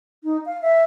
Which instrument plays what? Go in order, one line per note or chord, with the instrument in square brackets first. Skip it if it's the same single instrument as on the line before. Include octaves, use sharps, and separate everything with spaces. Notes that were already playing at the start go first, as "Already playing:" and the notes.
[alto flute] D#4
F5
E5